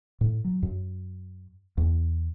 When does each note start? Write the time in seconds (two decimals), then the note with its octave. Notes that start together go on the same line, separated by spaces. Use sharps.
0.21 A2
0.44 F#3
0.63 F#2
1.77 E2